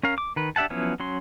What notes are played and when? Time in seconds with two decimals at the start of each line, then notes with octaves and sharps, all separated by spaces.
0.03 C#4 A#4 F5
0.18 D6
0.36 D#3 B4
0.56 D4 G4 E5 F#5 A5
0.70 F3 F#3 B3 C#4 E4
1.00 F#3 C#4 C6